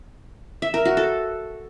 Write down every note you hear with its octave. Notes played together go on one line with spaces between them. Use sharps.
E5
A#4
F#4
A4